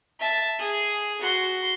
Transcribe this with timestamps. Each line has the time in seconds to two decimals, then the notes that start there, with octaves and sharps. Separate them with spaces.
0.20 E5 A5
0.59 G#4
1.21 F#4 C6